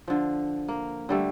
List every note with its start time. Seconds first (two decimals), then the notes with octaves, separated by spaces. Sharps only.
0.08 D3 F3
0.68 A#3
1.09 D3 G3 A3